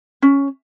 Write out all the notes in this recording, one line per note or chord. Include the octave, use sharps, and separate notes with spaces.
C#4